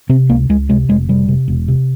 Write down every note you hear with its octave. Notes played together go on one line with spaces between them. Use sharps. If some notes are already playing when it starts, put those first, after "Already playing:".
C3 C4
C#2 A#3
C#2 G#3
C3 G#3
F1 G#3
C3 G3
C3
E1
C3